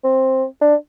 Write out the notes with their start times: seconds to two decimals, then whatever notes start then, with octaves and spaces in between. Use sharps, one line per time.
0.04 C4
0.62 D4